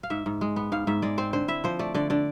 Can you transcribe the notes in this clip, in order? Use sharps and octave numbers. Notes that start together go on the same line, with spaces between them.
F5
G#2 E5
G#2
G#3
B3
G#2 F5
G#2 E5
G#3 D5
C4 C5
D3 C5
E4 E5
F3 C5
A3 D5
D3 D5
D3 D5